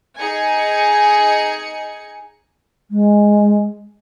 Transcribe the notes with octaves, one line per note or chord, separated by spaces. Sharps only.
D#4 G#4 G#5 C#7
G#3